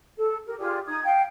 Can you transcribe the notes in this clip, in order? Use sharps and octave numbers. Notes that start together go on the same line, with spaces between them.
A4
G4 A#4
F4 G4 G#4 D5
D#4 D#6 G#6
F5 G5